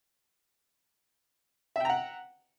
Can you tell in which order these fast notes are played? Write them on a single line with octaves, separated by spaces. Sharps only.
E5 G5 A#5 F#5